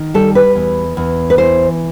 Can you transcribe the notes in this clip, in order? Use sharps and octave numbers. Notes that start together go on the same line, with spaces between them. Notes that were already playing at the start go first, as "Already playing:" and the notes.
Already playing: D#3
G3 A4
B4
E2
E2
B4
E3 C5